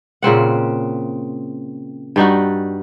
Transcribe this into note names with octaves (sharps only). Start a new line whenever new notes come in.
A#2 C#3 C4 F#5
G2 G3 D#4 F#4